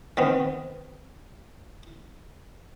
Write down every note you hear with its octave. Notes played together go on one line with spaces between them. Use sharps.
D#3 B3 C4